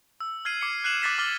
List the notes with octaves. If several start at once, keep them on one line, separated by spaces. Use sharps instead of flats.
E6
F6 G#6 C7 D#7
D6 C7 C#7
F#6 C7 D#7 E7 F#7
D6 F#6 A6 B6 C7 E7
D6 F6 A6 F#7 G7